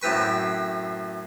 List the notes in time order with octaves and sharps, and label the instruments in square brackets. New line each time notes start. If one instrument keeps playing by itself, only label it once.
[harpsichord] F#2 A2 C4 B4 C#6